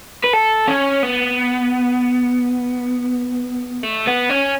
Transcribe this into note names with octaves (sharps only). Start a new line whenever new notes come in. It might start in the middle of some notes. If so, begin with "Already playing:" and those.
B4
A4
C#4
B3
A3
B3
C#4